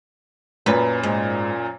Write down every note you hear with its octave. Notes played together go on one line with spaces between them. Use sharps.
F#2 A#2 B4
G#2